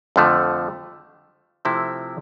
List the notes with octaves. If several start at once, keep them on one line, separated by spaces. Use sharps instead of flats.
F2 D3 F3 A3
C3 F3 A3 C4 E4